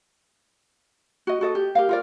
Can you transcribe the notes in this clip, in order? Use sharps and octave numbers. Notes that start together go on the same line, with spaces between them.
F#4 D#5
F#4 A4 D#5
G4
G4 A#4 F5
F4 A#4 D5